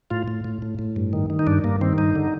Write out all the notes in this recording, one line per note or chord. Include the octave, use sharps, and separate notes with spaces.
A2 F4
A2
A2
A2
A2
G2
D#3
D#3
D#4
G2 D4
G2 A#3
D#3 C4
G2 D#4
D3